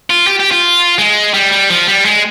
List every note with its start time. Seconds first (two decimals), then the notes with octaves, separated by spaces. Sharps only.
0.10 F4
0.27 G4
0.39 G4
0.51 F4
0.99 G#3
1.34 G3
1.52 G3
1.70 F3
1.87 G3
2.05 G#3